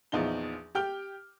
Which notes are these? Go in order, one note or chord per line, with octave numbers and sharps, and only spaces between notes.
A#1 E2 F3 D#4 G7
G4 G5 F6 G7